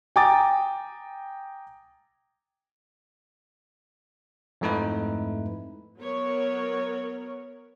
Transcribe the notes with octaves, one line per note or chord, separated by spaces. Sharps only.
G5 G#5 A#5 D6 D#6 A6
F2 G#2 A3 D#4 E4 B4
F#3 B3 A#4 C#5